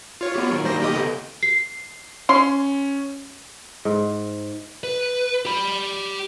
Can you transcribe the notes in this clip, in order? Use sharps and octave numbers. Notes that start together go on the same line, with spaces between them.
F4 C#5
B3 F#4 G4
A#2 D#3 F#3
G3 C5 A#6
A#3 G4 D#5
C#3 B3 A4
C7
C#4 C6
G#2
B4
G4 B5